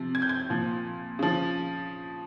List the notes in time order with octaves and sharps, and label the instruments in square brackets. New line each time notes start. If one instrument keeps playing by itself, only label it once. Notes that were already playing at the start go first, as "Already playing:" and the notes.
Already playing: [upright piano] C3 F3
G#6
G6
G#6
A#2 F3
C#3 F3